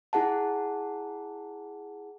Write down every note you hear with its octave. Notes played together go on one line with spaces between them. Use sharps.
E4 G#4 F#5 A5